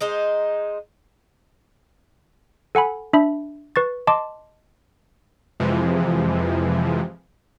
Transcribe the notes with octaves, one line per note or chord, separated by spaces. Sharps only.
G#3 D#4 C5
A4 F#5 G#5 B5
D4 E5 B5
B4 C#6 A6
D#5 A5 C6 D6
F2 C3 E3 F3 G#3